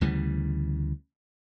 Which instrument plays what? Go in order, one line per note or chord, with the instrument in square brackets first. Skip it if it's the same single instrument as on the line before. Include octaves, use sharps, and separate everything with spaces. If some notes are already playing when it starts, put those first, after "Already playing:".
[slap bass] D2 C#3 E3 G3